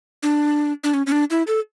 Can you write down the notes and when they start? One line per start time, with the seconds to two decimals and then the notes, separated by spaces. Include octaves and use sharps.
0.23 D4
0.84 D4
0.94 C#4
1.07 C#4
1.12 D4
1.30 E4
1.47 A4